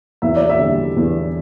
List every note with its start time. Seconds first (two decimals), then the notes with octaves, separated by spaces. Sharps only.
0.22 E2 E5
0.36 D5
0.49 E5
0.59 D3 G3
0.96 E2